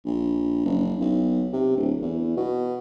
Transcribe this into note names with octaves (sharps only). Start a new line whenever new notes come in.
A#1
F#1
B1
C3
D1
E2
B2